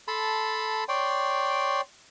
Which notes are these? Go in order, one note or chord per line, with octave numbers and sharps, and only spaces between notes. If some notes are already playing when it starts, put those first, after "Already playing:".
A4 A5 B5 C6
C#5 D5 G5 C6